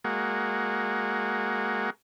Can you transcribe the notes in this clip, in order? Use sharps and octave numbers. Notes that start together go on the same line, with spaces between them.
G#3 A#3 F#4